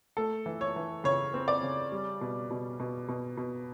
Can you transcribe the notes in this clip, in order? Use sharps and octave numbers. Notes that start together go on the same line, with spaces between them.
A3 A4
E3
C#5
E3
C#3 C#5
C4
D5
C#3
G3
B2
B2
B2
B2
B2